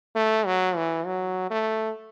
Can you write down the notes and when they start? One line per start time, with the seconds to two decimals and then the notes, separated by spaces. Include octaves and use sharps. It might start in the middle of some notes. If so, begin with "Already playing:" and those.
0.16 A3
0.46 F#3
0.76 E3
1.06 F#3
1.51 A3